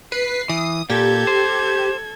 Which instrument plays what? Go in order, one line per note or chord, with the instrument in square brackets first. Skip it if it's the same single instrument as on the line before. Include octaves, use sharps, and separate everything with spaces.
[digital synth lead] B4 [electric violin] C7
[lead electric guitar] E3 [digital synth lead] D#6
[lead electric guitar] A#2 [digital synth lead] G4 [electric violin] A4 G#6
[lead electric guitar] C5